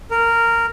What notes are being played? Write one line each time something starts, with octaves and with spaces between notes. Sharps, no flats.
A#4